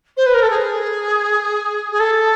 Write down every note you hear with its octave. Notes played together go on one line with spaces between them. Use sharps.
C5
B4
A#4
A4
G#4
G#4
A4